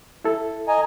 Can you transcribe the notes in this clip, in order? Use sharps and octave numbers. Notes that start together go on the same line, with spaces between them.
E4 A4
D#5 G#5 A#5